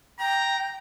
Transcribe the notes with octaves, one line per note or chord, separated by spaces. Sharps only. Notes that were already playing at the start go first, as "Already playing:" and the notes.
G5 A#5